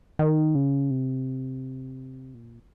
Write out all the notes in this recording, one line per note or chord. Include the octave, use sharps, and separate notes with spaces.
D#3
C#3
C3
A#2